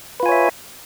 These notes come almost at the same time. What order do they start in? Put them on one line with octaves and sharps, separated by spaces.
B4 F4 G#5 C#5 E5